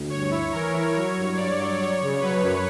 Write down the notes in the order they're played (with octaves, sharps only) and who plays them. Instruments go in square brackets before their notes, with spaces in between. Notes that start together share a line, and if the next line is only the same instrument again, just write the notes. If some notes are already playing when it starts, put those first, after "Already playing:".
Already playing: [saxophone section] D2
[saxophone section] G2 [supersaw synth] C#5
[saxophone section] E4
[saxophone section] E3 [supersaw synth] A#4
[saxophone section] E4
[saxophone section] F#3 [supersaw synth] C#5
[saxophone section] G2
[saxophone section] G2 [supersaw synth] D5
[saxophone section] F#3
[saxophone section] F#3 [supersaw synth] C#5
[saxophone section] C#3
[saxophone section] F#3 [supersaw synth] B4
[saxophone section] F#2